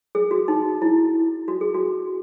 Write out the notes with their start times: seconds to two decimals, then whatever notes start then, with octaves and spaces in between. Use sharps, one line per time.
0.15 G#4
0.31 F#4
0.48 D#4
0.82 E4
1.48 F#4
1.61 G#4
1.74 F#4